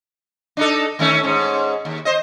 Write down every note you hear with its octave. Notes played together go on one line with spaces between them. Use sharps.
D4 D#4 A4
D#3 A3 C#4
G#2 C#4
D#2
C5 D#5